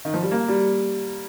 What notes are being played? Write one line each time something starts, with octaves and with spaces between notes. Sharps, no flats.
D#3
F3
G3
A#3
G3